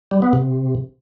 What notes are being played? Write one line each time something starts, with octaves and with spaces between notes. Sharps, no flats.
G3
B3
C3